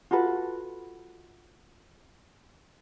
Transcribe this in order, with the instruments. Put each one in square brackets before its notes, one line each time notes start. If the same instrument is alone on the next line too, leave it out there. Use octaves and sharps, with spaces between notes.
[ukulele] F4 F#4 A4 B4